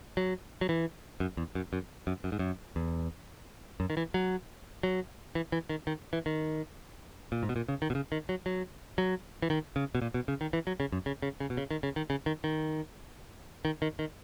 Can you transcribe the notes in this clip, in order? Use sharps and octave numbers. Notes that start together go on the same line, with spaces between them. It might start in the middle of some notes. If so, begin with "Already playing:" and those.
F#3
F#3
E3
F#2
E2
F#2
F#2
F#2
F#2
G#2
F#2
E2
F#2
D#3
E3
F#3
F#3
E3
E3
D#3
D#3
E3
D#3
A#2
G#2
B2
A#2
C#3
D#3
B2
C#3
D#3
F#3
F#3
F#3
E3
D#3
C#3
B2
A#2
B2
C#3
D#3
E3
F#3
C#3
F#2
C#3
C#3
C#3
B2
C#3
D#3
C#3
D#3
C#3
D#3
D#3
D#3
D#3
D#3